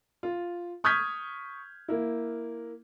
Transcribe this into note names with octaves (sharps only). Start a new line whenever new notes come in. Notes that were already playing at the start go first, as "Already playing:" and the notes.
F4
C#6 D#6 F6 G6 G#6 B6
A#3 E4